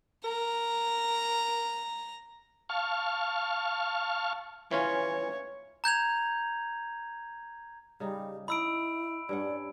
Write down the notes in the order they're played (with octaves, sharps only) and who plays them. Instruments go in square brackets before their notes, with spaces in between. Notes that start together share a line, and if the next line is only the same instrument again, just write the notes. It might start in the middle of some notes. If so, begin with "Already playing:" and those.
[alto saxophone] A#4 [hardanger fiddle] A#5
[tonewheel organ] F5 A5 C#6 F6
[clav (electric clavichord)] E3 C#4 F4 [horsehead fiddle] C#5
[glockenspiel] A#5 G6 G#6 F7
[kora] C#3 D#4 [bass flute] G3
[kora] D#4 [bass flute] E4 [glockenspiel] B5 E6 D7
[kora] G2 C#4 F#5 [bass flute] D5